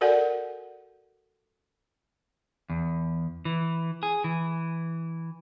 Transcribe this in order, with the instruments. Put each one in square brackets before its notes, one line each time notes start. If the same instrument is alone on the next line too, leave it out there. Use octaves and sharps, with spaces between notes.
[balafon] F#4 A4 A#4 D5 F#5 G#5
[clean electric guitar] E2
E3
G#4
E3